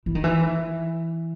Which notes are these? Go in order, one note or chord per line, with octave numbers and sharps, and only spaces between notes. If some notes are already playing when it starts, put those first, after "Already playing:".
E3
D#3
E3